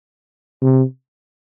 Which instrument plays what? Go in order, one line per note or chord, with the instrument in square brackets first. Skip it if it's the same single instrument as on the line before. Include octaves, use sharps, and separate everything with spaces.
[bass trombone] C3